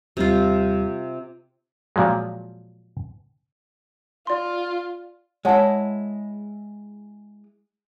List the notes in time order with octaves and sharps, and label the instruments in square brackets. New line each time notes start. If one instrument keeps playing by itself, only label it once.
[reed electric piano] D#2 G3 [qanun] C3 F4
[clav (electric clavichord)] A#2 F3 F#3 G#3
[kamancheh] F4 [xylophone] D5 C6
[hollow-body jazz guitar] G#3 E4 [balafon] C#5 F#5 A5